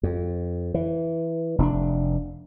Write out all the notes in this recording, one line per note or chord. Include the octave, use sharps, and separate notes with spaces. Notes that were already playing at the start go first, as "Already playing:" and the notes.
F2
E3
F1 C#4 D4